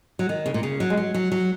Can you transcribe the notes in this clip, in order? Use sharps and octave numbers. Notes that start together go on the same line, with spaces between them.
F#3
D#3
C#3
A#2
C#3
F#3
G#3
F#3
F#3
F#3